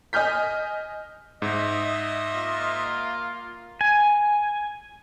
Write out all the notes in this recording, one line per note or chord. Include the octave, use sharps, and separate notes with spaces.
D#5 G#5 F6 G6 B6
G#2 D#5 E5
A#3 F4
G#5